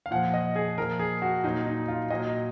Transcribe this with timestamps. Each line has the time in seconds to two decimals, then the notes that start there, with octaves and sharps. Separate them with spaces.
0.06 F5
0.11 A#2 F3 F#5
0.34 D#5
0.56 G#4
0.78 A#2 F3 A#4
0.99 G#4
1.22 F#4
1.44 A#2 F#3 D#4
1.67 D#4
1.88 F4
2.10 A#2 F#3 D#5